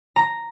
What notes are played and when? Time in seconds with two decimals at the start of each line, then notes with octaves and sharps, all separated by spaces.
0.16 A#5